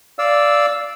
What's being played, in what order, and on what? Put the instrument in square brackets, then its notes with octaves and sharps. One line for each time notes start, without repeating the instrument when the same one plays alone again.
[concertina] D5 F5 E6